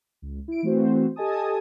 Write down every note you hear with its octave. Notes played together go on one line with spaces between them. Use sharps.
C#2
E4 D7
E3 A3 C4 F#4 C5
G4 A4 D#5 G#5 A5 D#6